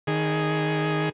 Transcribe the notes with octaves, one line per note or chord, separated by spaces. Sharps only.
D#3 G#4